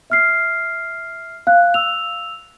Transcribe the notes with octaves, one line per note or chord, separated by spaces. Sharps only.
E5 F6 C7
F5 F#6
E6 F7